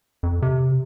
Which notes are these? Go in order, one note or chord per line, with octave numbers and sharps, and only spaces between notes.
F2
C3